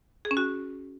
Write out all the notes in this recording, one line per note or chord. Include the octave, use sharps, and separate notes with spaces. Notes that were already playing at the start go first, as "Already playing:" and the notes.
G#4
C#4
F#4